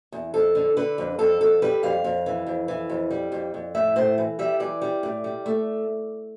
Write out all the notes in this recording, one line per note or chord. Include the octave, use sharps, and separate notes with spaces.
E2
F2 A4
D3
D3 B4
F2
F2 A4
F2 A4
G3 B4
F2 F5
F2
E3
F2
E3
F2
G3
F2
F2
A2 E5
A2 C5
E3
G3 E5
E3 D5
G3
A2
G3
A3